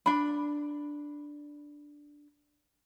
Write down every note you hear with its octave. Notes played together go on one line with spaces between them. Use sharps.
D4 B5